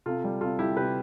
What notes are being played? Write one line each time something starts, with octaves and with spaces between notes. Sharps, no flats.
C3 F4 A4
G3
C3 F4 A4
G3 E4 G4
C3 G4 B4